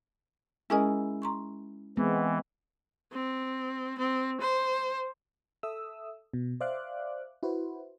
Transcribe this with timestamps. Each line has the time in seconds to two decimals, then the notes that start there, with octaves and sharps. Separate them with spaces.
0.70 G#3 C#4 E4 G#4 A#4 D#5
1.22 A#5 C6 C#6
1.97 E3 G#3 B3 C4
3.13 C4
3.98 C4
4.40 C5
5.63 A4 E5 D#6 E6
6.33 B2
6.61 C5 D5 E5 F5 D6 F#6
7.43 E4 F#4 B4 C5